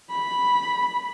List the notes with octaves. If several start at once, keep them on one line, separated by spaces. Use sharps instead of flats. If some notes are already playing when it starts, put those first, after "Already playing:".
B5